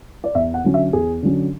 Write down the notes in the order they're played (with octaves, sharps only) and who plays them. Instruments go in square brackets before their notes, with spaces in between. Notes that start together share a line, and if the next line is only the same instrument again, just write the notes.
[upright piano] D5
E2 E5
F#5
D3 F#3 C#4
E5
E2 G#4
D3 F#3 C#4